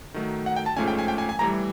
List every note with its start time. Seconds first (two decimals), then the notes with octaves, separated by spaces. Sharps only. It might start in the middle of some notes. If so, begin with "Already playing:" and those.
0.14 D#3 F#3 A3
0.46 F#5
0.56 G5
0.66 A5
0.77 G#2 F3 A3 C#4 G#5
0.88 G5
0.99 G#5
1.08 G5
1.18 G#5
1.29 G#5
1.39 A2 E3 G3 A#5